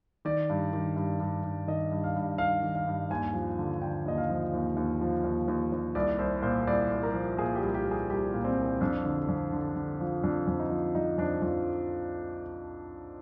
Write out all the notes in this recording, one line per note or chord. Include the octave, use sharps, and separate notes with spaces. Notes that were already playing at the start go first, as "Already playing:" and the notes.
D#3 D5
G2
D#3
G2
G2
G2
D#3 D#5
G2
F5
G2
D#3 F5
D#3
F5
G2
D#2 G#5
F3
D3
D3 G5
D#2 D#5
F5
F3
D#2
D#2
F3
D#2
D#2
D#2
C2 D5
C2 C5
A#2 C5
C2 D5
C2
A#4
F3
A#2 G#4
G4
C2
G4
C2
G#4
C2 G4
A#2
C4
C2
F2 D4
D3
F2
D3
D3
F3
F2 D4
F2
D#4
F3
F2 D#4
F2 D4
F2 F4